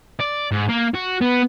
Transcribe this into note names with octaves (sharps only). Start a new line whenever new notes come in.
D5
G#2
A#3
F#4
B3